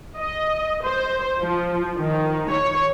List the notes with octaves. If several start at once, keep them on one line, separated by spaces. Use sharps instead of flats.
D#5
C5
F3
D#3
C#5